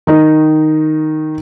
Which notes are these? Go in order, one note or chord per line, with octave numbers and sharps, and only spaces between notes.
D#3 D#4